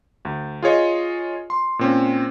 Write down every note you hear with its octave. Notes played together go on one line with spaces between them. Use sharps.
D2
F4 G#4 C#5 D#5
C6
A#2 C4 C#4